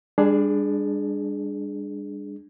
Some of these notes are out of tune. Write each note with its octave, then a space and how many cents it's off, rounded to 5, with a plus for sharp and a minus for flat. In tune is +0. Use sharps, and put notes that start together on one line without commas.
G3 +40 D4 +0 G#4 +10